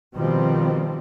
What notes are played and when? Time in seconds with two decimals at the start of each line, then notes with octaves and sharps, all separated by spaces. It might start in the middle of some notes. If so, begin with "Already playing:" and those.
0.17 B2 D#3 F3 G3 C4